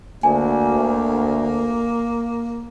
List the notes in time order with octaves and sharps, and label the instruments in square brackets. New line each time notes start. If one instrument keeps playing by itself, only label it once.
[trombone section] D2 [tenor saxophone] A#3 [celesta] G#5